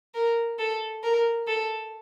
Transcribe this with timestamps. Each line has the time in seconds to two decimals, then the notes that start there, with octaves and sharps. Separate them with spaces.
0.14 A#4
0.59 A4
1.03 A#4
1.47 A4